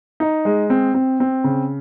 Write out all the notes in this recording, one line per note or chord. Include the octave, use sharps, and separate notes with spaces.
D#4
G#3
C4
C4
C4
C#3